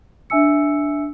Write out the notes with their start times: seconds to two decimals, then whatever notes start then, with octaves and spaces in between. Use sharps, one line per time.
0.30 D4 E5 G#5 E6 C#7